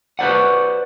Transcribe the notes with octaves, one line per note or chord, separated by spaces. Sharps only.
F#4 B4 C5 D5 F#5